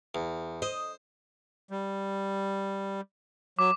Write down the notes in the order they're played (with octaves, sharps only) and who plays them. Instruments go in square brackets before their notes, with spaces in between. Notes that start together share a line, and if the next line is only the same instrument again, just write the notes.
[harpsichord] E2
[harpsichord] C5 [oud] D#5
[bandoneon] G3
[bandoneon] F#3 [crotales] D6